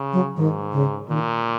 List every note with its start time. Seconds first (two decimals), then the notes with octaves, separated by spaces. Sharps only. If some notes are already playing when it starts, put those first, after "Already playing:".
Already playing: C#3
0.13 F#3
0.37 G#2 D#3
0.72 C#3
1.08 A#2 D#3